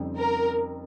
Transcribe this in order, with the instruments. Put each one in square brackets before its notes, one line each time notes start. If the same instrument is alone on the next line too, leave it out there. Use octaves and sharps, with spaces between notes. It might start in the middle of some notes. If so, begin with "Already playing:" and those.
Already playing: [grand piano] F2 C#3 G3 C4 D#4
[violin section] A#4